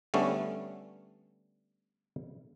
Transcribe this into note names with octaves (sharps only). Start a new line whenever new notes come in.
D3 G3 A3 B3 C#4